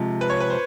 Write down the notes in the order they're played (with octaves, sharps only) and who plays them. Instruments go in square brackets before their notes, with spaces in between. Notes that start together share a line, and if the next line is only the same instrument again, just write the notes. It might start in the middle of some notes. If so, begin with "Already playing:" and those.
Already playing: [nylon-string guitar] C3 F3 G#3
[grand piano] B4
C#5
B4
C5